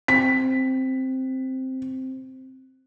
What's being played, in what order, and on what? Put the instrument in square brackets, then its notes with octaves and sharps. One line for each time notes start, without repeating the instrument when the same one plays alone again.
[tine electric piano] C4 [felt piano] B6